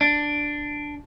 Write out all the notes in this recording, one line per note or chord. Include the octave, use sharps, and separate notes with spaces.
D4